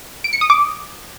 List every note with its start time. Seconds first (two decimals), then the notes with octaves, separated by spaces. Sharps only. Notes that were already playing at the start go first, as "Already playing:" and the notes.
0.24 D7
0.33 C#7
0.41 D#6
0.50 D6